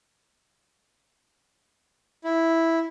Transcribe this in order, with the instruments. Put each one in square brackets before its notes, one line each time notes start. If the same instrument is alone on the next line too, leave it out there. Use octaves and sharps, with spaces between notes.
[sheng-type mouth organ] E4